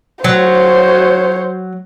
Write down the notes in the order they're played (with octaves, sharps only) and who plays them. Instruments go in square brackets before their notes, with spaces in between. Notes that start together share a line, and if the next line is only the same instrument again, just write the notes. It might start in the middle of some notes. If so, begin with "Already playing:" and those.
[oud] F#3 [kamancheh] C5 C#5